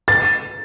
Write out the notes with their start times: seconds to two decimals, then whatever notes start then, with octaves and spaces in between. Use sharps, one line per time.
0.08 A6